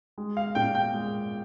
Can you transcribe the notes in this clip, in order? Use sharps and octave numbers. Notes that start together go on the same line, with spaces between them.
G#3
F5
A#2 G5
G5
G#3